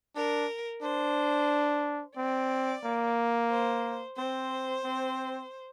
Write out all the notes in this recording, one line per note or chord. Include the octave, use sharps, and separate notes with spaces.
D4 A#4
D4 C5
C4 D5
A#3
C5
C4 C5
C4